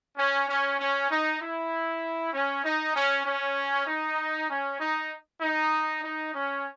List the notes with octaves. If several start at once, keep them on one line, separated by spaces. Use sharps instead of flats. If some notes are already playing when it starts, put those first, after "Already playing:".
C#4
C#4
C#4
D#4
E4
C#4
D#4
C#4
C#4
D#4
C#4
D#4
D#4
D#4
C#4